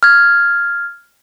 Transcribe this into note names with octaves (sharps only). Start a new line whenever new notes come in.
F6 G#6